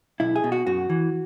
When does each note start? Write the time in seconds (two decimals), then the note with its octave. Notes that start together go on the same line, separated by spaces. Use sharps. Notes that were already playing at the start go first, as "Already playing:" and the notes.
0.20 B1 E4
0.36 G#4
0.44 B2
0.52 F#4
0.67 F#2 F#4
0.90 E3